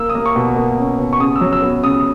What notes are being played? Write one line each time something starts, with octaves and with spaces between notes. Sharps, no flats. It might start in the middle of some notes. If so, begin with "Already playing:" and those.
Already playing: A#3 E6
D#6
A#3
C#6
B2
A#3
C#4
B2
C#6
C#3 D#6
E6
F#3
E6
B3
C#3 D#6